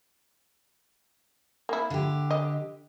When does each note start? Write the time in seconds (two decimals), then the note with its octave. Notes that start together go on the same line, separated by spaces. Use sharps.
1.69 A#3 E4
1.90 D3 G4
2.31 D#5